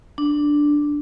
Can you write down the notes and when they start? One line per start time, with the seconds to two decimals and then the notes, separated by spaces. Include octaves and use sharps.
0.18 D4